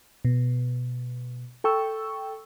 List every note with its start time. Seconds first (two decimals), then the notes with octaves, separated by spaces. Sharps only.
0.25 B2
1.64 A4 G5 C#6 E6